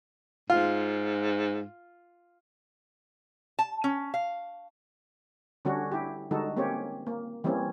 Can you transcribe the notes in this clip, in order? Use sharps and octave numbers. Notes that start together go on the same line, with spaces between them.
G#2 F4
A5
C#4
F5
D3 G3 C#4 D4 F#4
E4 G4
D3 G3 G#3 D#4 F#4 A4
A#3 C4 C#4 G4 C#5
A#3
E3 G3 A#3 C4 C#4